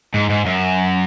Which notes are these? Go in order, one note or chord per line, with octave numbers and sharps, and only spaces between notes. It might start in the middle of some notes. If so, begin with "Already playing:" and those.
G#2
G#2
F#2